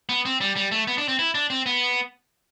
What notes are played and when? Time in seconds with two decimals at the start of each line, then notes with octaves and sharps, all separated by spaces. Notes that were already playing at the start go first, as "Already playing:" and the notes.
0.09 B3
0.25 C4
0.41 G3
0.56 G3
0.72 A3
0.87 B3
0.98 D4
1.08 C4
1.19 E4
1.35 D4
1.50 C4
1.66 B3